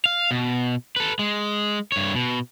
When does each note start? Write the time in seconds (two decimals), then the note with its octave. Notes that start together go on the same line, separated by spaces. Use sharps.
0.06 F5
0.31 B2
0.96 A4 B4
1.19 G#3
1.92 G2 C#5
2.15 B2